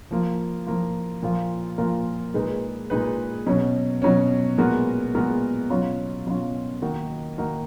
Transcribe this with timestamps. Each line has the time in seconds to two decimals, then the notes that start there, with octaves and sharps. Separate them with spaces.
0.11 F3 A#3 F4
0.67 F3 A#3 F4
1.23 A#2 F3 A#3 F4 A#4
1.78 A#2 F3 A#3 F4 A#4
2.34 A#2 G#3 D#4 G#4 B4
2.90 A#2 G#3 D#4 G#4 B4
3.47 B2 F#3 C#4
4.02 B2 F#3 C#4
4.58 A#2 G#3 B3 F#4 A#4
5.14 A#2 G#3 B3 F#4 A#4
5.70 B2 F#3 C#4 F4
6.27 B2 F#3 C#4 F4
6.82 D#3 A#3 D#4 F#4 A#4
7.38 D#3 A#3 D#4 F#4 A#4